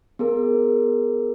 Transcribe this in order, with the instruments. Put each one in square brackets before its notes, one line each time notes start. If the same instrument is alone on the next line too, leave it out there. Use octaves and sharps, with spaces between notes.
[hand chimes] B3 G#4 A#4